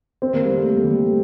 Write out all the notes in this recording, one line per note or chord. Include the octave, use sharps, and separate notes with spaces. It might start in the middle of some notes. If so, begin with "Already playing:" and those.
C4
A#3
G3
A3
A3
G3
A3